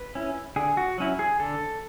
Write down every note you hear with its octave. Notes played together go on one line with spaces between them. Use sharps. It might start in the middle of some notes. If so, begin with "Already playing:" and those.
Already playing: B4
C#4 E4
D3 G#4
F#4
F#3 C#4 E4
G#4
D3 A4